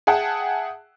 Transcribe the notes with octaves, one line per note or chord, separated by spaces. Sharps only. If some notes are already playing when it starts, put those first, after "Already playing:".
G#4 E5 F#5 G5 A5